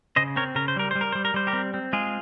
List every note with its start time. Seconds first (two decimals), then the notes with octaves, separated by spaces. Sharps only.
0.16 C#3 C5 D#5
0.36 C4 A#4 C#5
0.55 C#3 A#4
0.68 C5
0.76 G3 A#4
0.91 G3 C5
1.01 A#4
1.12 G3 C5
1.25 A#4
1.34 G3 C5
1.47 G4 A#4
1.53 C4
1.74 C4
1.93 G#3 F4 G#4